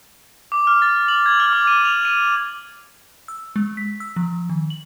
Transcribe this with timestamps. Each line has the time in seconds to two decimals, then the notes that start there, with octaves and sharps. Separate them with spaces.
0.52 D6
0.67 F6
0.82 A6
1.08 F#7
1.26 G#6
1.40 F6
1.53 D6
1.67 D#7
1.85 F7
2.05 D#7
3.28 E6
3.56 G#3
3.77 B6
4.00 E6
4.16 F3
4.50 D#3
4.70 F#7